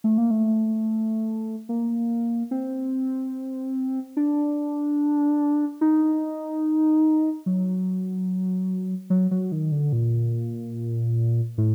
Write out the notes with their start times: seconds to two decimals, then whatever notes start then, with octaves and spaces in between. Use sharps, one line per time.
0.04 A3
0.18 A#3
0.31 A3
1.69 A#3
2.51 C4
4.17 D4
5.81 D#4
7.46 F#3
9.10 F#3
9.31 F#3
9.52 D#3
9.72 D3
9.93 A#2
11.58 A2